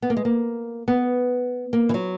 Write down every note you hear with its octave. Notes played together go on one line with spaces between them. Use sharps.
B3
A#3
G#3
A#3
B3
A#3
E3
F#3